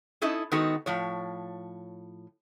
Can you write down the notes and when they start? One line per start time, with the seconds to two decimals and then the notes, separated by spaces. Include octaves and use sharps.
0.22 C#4 D#4 E4 A4 D#5
0.52 D#3 G#3 B3 D#4 F#4 A4
0.86 A2 F3 C#5